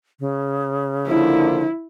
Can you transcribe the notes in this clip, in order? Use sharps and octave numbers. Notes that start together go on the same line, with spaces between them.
C#3
D3 F3 A#3 E4